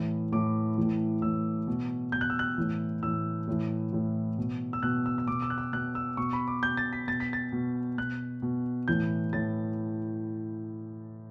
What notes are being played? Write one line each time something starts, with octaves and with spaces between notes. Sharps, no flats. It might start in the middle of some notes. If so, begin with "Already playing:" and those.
Already playing: A2 E3
A2 E3 D6
A2 E3
A2 E3 E6
B2
B2 G6
F#6
E6
F#6
A2 E3
A2 E3 E6
A2 E3
A2 E3
B2
E6
B2 F#6
E6
E6
B2 D6
E6
F#6
E6
B2 F#6
E6
B2 C#6
B5
D6
B2 G6
A6
B6
B2 A6
B6
A6
B2
B2 F#6
B2
A2 E3 G6
A2 E3 A6